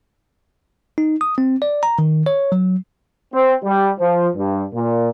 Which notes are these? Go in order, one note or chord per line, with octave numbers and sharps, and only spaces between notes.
D#4
D#6
C4
D5
A#5
D#3
C#5
F#3
C4
G3
F3
G2
A#2